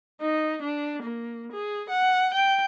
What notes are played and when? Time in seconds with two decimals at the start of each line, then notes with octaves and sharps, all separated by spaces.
0.21 D#4
0.62 D4
1.02 A#3
1.52 G#4
1.89 F#5
2.34 G5